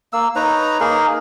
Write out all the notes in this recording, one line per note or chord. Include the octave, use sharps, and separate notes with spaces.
A#3 E6
D#4 B4 C#5 A#5
A#3 D#4 G#4 A#4